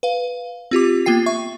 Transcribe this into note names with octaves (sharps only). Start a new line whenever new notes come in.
B4 F5
C4 F4 G4 D6
A#3 B3 F4 G5 C7
E5 C#6